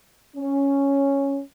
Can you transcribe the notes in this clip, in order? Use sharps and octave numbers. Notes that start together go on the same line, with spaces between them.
C#4